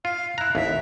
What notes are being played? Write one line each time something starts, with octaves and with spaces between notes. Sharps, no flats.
F4 F5
E4 A#5 F#6
A1 D#2 E5